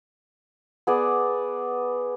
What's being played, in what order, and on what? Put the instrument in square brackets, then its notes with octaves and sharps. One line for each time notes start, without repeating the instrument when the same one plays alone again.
[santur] B3 G#4 D5 F#5